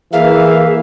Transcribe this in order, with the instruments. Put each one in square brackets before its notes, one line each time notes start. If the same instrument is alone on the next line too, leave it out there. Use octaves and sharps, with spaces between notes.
[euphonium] E3 [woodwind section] A#3 E5 [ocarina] G#4 [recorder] F5